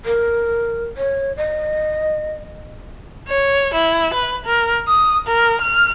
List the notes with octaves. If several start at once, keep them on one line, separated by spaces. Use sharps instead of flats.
A#4
C#5
D#5
C#5
E4
B4
A#4
D#6
A#4
F6